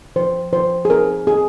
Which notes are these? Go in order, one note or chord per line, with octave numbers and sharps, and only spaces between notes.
F3 C5
F3 C5
G#4
C4 A#4
C4 G#4